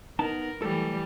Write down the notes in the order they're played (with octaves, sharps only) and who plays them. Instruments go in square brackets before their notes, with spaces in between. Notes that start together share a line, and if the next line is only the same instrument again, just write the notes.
[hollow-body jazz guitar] B3 D#4 A5 [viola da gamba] A#4
[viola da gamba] E3 G3 [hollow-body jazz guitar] F#3 A3 A4